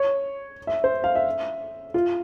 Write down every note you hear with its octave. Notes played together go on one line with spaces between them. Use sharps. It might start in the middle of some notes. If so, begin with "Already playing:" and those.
Already playing: C#5
E5
C5
F5
E5
F4